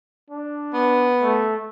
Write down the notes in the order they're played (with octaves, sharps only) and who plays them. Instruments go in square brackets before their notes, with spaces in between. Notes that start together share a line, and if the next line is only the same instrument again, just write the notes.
[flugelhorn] D4
[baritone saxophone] B3
[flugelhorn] A3